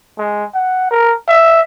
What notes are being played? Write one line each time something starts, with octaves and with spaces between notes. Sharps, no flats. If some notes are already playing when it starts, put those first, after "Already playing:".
G#3
F#5
A#4
E5